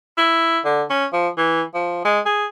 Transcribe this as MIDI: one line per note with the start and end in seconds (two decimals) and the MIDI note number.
0.17 0.59 64
0.65 0.83 50
0.90 1.05 61
1.13 1.28 53
1.38 1.63 52
1.75 2.02 53
2.05 2.20 56
2.26 2.45 68